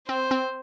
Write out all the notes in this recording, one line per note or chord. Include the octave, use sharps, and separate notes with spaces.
C4 C5
C4